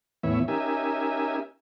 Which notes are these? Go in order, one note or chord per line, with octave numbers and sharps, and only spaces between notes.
E2 A2 E3 B3 C#5 E5
C#4 D#4 G4 A#4 E5 G#5